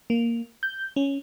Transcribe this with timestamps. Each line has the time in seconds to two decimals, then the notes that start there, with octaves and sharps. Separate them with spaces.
0.10 A#3
0.63 G6
0.96 C#4